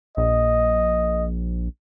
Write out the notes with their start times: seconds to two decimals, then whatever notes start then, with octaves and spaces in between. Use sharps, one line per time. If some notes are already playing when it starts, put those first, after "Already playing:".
0.17 A#1 D#5